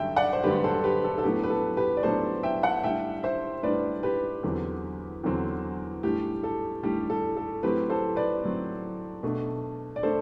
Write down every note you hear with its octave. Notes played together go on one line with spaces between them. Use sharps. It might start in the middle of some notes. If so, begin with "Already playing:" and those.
Already playing: G2 D3 F#3 A3 E5 G5
D5 F#5
C5
G2 D3 F#3 A3 G4 B4
A4 C5
G4 B4
A4
A4
A2 F#3 B3 D4 G4
B4
A4
G4 B4
D5
A2 F#3 B3 D4 A4 C5
E5 G5
F#5 A5
A2 G3 D4 E5 G5
C5 E5
A2 G3 D4 B4 D5
G4 B4
E2 D3 F#3 C4
E2 D3 F#3 C4
A2 G3 D4 G4
A4
A2 G3 D4 G4
A4
A4
A2 F#3 C4 G4 B4
A4 C5
B4 D5
A2 F#3 C4
B2 A3 D4
D5
A3 D4 A4 C5